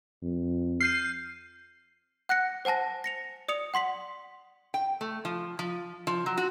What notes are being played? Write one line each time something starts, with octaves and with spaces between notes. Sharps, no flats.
F2
F6 G6 C7 D#7
F#5 F#6 A#6 C#7
C5 F#5 G#5 A5 A#6
A#6 C#7 F7
D5 D#6 C#7 F7
F#5 C6 B6 F#7
G5
A3
F3
F3
F3
F#3
F#4